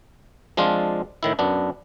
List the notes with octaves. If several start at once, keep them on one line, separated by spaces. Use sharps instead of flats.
F3 G#3 C4 D4 F4
A2 D#3 E4
F#2 B3 D4